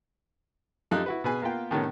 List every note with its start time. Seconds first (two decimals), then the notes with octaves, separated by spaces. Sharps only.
0.91 F#2 D#4 F4 G4 A4 F#6
1.06 E4 F#4 B4
1.24 B2 G#4 B4 G#5
1.42 A#3 B3 F4 G5
1.71 A2 C3 D#3 A3 B3 C#4